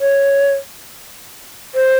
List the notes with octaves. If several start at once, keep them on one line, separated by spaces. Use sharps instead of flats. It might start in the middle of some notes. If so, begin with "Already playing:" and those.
C#5
C5